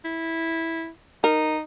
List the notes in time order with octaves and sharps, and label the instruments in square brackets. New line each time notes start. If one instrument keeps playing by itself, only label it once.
[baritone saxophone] E4
[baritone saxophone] D#4 [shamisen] A#4